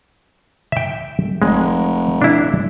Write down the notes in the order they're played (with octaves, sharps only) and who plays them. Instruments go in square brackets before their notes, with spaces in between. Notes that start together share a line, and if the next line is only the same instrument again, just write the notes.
[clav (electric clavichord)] E5 G5
[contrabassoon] F1 [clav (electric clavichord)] G#3
[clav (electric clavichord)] D4 E4